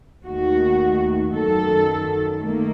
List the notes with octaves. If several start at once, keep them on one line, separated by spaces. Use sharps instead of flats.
D#2 D#3 A3 F#4
F#2 D#3 F#3 A4
D#3 A3 A#3